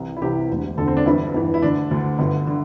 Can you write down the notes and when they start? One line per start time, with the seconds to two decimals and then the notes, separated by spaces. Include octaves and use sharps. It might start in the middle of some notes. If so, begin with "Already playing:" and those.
Already playing: C2 C3 E3
0.17 E4
0.22 C2 C3 E3 G4
0.49 E1 D2 D3
0.78 E1 D2 D3 A4
0.88 C4
0.97 D4
1.06 G1 G2 E3 E4
1.34 G1 G2 E3
1.54 E4
1.62 D2 D3 D4
1.91 D2 D3
2.19 G1 G2 D3
2.47 D3